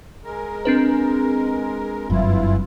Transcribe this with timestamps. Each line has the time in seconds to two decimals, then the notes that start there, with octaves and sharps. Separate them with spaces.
0.24 G#3 A#4
0.65 C4 D4 B4
2.10 F#1 G2 E3 F#3 E4 F4